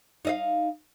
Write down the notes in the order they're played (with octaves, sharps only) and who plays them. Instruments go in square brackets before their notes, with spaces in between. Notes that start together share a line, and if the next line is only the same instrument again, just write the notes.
[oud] D#4 D#5 F5